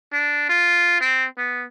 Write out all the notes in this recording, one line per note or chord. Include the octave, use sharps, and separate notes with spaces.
D4
F4
C4
B3